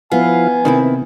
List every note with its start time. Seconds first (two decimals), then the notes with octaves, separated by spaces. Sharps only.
0.12 F3 B3 E4 F5 G#5
0.65 C3 D#3 C4 E4